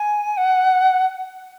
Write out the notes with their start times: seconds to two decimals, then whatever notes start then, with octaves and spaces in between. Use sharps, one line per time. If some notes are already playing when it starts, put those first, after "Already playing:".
Already playing: G#5
0.37 F#5